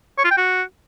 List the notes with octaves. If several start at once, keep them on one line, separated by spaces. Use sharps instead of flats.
C#5
F4
G5
F#4